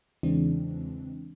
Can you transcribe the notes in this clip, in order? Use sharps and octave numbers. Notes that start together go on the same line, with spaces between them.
E2 C#3 E3 G#3 C4 D4